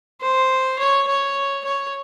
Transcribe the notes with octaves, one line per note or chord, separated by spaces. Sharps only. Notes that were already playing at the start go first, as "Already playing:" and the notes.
C5
C#5
C#5
C#5